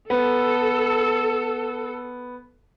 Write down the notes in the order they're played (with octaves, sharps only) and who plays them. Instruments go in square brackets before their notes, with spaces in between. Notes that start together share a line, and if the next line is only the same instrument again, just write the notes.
[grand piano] B3 [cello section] A4